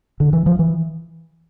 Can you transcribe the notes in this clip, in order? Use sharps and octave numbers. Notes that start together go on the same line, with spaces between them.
D3
E3
F3
E3